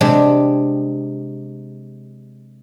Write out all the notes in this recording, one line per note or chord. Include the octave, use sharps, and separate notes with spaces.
C3 G#3 D4 G4